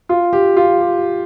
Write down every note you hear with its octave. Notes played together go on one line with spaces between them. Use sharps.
F4
G4
F4
G4